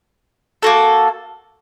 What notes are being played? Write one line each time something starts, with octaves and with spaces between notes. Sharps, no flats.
A#3 F#4 A4